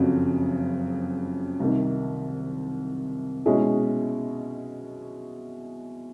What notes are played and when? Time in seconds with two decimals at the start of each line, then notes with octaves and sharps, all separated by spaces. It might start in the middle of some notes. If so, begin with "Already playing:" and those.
Already playing: F#1 F2 C#3 F#3
1.60 C2 C3 D#3
3.46 B2 G#3 C#4 E4 G#4